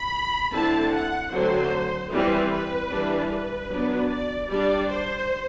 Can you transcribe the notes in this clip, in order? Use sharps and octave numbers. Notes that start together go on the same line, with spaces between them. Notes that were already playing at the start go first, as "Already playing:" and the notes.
Already playing: B5
D3 A3 C4 E4 A5
F#5
D3 F#3 A3 C4 C5
E3 G3 C4 B4
B4
E3 G3 D4
B4
F#3 B3 D4
D5
G3 D4 D5
C5